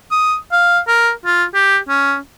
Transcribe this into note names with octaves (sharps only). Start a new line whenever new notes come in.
D#6
F5
A#4
F4
G4
C#4